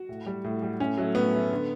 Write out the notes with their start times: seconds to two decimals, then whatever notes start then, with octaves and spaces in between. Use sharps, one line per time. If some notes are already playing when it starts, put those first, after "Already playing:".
Already playing: F#4
0.09 A2
0.26 G3
0.44 A2
0.62 G3
0.80 A2 C#4
0.97 F#3 A3
1.15 A2 B3
1.34 F#3 A3
1.52 D3